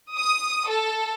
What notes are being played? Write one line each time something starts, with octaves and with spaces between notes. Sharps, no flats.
D#6
A4